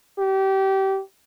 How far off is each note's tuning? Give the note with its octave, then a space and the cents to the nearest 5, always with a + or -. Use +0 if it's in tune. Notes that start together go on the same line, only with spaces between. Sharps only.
G4 -25